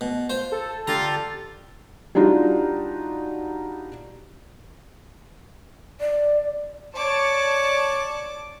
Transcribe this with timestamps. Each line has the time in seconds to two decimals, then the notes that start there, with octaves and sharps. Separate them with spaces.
0.01 B2
0.30 F4 C5
0.52 A4
0.87 D3 F4 G4 A4 A5 A#5
2.15 G3 D4 D#4 F4 F#4
6.01 D5
6.96 C#5 D5 A5 C#6 D6